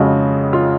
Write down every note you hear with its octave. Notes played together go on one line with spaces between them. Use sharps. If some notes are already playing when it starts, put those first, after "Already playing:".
Already playing: F2 C#3 G#3 F#4
F4